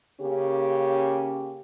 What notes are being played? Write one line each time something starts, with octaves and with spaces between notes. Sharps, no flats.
C#3 A#3 C#4 G4